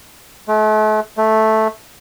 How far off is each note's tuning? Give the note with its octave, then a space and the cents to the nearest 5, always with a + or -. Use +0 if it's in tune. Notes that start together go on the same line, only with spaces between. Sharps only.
A3 -40
A3 -5